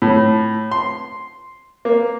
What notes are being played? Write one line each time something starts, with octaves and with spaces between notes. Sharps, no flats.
A2
C6
A#3